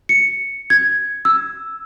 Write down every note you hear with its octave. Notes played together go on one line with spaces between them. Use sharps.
C#7
G#6
E6